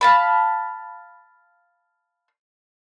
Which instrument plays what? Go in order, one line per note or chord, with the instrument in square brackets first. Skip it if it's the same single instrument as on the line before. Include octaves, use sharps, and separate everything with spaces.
[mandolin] F5 A5 B5